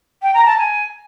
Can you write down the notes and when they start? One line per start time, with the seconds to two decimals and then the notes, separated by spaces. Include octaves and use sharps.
0.22 G5
0.34 A#5
0.46 A5
0.58 G#5